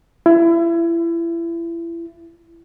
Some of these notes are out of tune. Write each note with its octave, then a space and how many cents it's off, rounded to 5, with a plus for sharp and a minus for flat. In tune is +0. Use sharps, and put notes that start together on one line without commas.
E4 +30